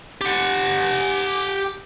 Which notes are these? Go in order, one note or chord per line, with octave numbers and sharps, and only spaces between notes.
G4 F#5